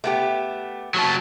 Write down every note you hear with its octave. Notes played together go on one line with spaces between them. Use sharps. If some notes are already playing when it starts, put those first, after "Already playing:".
A3 B3 G4
F#3 F#4 A5